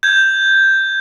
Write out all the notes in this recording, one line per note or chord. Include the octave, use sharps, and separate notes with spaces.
G6 G#6